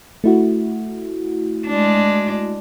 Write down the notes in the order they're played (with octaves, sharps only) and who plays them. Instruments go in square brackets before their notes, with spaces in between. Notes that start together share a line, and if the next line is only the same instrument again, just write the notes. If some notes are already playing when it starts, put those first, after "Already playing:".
[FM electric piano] A3 E4 F#4
[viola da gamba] G#3 D4